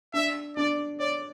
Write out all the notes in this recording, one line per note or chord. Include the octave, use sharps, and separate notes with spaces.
D4 E5
D4 D5
C#5 D5